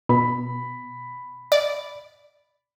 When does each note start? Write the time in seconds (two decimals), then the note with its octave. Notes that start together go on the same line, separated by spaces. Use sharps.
0.09 B2 B5
1.52 D5